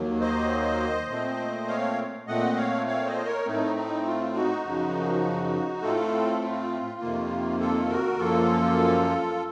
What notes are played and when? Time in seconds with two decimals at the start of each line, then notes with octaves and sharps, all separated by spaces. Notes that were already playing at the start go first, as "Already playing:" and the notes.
Already playing: D#2 D#3 F#3 A#3
0.21 C5 D#5
1.09 A#2 A3 C4
1.68 C#5 F5
2.27 A#2 A3 C4 D#5 F#5
2.57 C#5 F5
2.86 C#5 F5
3.06 C5 D#5
3.26 A#4 C#5
3.45 A2 A3 C4 D#4
3.76 D#4
4.05 F4
4.35 D#4 F#4
4.64 F#2 C#3 F3
5.82 A2 A3 C4 F4 A4
6.42 F4
7.01 F2 C3 D#3 A#3
7.60 F4 A4
7.89 F#4 A#4
8.19 F#2 F3 A#3 F4 A4